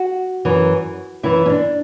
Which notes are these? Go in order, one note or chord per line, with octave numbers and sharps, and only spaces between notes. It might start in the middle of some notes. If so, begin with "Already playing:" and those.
Already playing: F#4
F#2 E3
F#2 E3 E4
C#4
D4